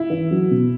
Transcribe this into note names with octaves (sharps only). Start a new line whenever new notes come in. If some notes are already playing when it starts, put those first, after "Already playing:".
Already playing: E4
E3
F#3
B2